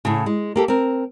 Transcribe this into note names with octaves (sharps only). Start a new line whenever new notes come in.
A2 C#3
G#3
A#3 G4 A4
C4 A#4